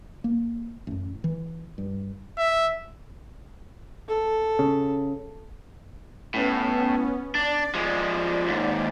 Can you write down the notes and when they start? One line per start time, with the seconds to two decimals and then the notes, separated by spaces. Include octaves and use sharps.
0.24 A#3
0.87 A1 F#2
1.24 E3
1.78 G2
2.38 E5
4.08 A4
4.59 C#3
6.34 A2 B3 C#4
7.35 D4 D5
7.75 F3 G#3
8.48 D#2 G#2